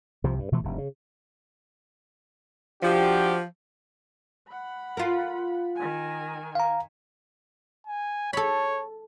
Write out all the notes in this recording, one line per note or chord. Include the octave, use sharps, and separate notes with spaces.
C2 C3 F3
G2
B2 E3 F3 A3
F1 G2
C#3
F3 D4 F#4 G4
F#5 B5
F4 A#4
D#3 G#5
F5 A#5
G#5
A4 C#5 B5